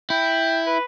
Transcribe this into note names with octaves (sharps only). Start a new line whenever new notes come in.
E4 G5
B4